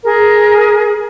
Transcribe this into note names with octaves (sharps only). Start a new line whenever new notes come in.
G#4 A#4